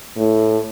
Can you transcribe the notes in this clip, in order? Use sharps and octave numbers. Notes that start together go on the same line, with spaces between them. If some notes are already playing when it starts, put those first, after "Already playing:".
A2